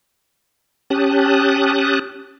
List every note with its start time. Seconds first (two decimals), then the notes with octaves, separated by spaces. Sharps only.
0.90 C#4 G4 A5 D#6 F#6